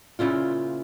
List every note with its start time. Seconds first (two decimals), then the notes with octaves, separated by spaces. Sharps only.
0.19 A#2 C#3 E4 F4